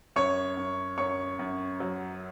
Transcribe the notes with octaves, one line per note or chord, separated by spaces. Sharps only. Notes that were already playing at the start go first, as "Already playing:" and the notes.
F#2 C#5 C#6
F#2
F#2 C#5 C#6
F#2
F#3